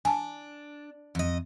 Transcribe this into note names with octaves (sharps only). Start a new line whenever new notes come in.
D4 G#5 A5
F2 D#5